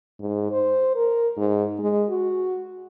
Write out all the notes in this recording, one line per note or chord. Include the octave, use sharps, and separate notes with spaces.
G#2
C5
A#4
G#2
G#3
F#4